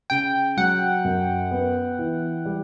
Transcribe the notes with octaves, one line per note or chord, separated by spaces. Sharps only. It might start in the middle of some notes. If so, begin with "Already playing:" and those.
C#3 G5
F#3 F#5
F#2
B3
E3
G3